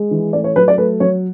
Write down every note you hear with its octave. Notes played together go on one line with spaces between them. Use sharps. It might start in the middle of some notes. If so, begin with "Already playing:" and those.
Already playing: G#3
E3
A3 D5
C#5
F#3 B4
D5
A3 B4
F#3 C#5